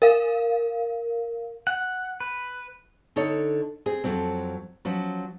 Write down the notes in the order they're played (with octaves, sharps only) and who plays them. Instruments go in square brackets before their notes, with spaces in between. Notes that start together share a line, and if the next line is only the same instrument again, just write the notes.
[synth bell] A#4 F5
[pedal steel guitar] F#5
B4
[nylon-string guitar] D3 D#4 A4 C#5
C4 G#4
F2 F3 F#3 C4
F3 F#3 C#4